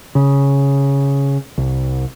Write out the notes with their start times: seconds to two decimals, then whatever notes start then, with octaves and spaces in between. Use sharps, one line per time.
0.15 C#3
1.58 C2